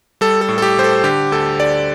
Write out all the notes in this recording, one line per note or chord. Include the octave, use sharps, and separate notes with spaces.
G3 A4
A4
A2
A4
G4
A2 C5
A4
D3 G4
D2 A4
D2 D5